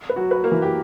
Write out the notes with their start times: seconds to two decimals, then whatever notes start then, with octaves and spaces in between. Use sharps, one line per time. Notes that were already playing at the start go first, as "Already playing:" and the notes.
0.09 B4
0.16 F#3 F#4
0.31 B4
0.44 A#3 A#4
0.52 E3
0.62 G4